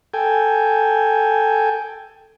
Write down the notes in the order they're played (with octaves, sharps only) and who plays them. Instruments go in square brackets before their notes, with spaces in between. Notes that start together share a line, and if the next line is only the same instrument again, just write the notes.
[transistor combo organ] A4 G5 G#5